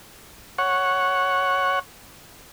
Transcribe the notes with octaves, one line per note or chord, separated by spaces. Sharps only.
C#5 F#5